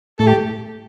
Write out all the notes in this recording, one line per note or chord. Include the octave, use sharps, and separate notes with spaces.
A2 A3 A4
G4